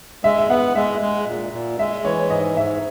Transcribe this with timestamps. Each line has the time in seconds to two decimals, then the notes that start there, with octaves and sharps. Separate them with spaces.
0.24 G#3 E5
0.38 E5
0.49 B3 F#5
0.75 G#3 E5
1.01 G#3
1.27 A#2
1.53 A#2
1.79 G#3 E5
2.05 E3 C#5
2.30 G#2 D#5
2.56 G#2 E5